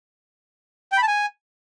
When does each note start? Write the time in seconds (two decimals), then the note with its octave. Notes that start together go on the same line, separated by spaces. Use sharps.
0.92 G5
0.97 B5
1.03 A5
1.08 G#5